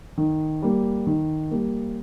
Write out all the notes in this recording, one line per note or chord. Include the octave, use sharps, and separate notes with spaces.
D#3
G3 A#3
D#3
G3 A#3